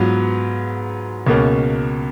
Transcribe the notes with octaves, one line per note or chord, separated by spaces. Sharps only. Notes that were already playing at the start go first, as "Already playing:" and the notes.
Already playing: G#2 F#3 B3 F4
C#2 B2 A#3 C#4